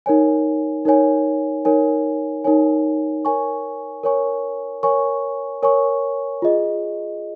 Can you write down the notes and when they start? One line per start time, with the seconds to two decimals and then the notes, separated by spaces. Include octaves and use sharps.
0.06 D#4 A#4 C#5 G#5
0.85 D#4 A#4 C#5 G#5
1.65 D#4 A#4 C#5 G#5
2.44 D#4 A#4 C#5 G#5
3.25 A#4 C#5 G#5 C#6
4.03 A#4 C#5 G#5 C#6
4.83 A#4 C#5 G#5 C#6
5.63 A#4 C#5 G#5 C#6
6.42 F4 G#4 D#5